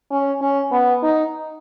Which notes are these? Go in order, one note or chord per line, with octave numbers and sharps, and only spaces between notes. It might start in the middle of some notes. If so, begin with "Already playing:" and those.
C#4
C#4
B3
D#4